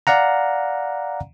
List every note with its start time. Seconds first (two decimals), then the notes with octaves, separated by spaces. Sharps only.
0.07 D5 F5 F#5 A#5